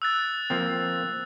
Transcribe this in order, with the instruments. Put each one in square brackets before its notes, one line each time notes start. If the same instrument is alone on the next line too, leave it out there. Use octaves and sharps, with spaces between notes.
[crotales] E6 F#6 A6
[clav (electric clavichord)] F3 A#3 C4